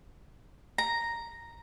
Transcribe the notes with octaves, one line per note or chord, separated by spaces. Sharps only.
A#5